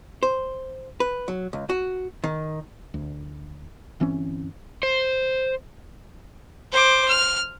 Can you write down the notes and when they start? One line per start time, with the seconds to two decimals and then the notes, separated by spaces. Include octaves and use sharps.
0.23 C5
1.00 B4
1.28 F#3
1.53 C#2
1.69 F#4
2.24 D#3
2.94 D2
4.00 G1 E3 C4 C#4
4.83 C5
6.72 C5 D6
7.08 F6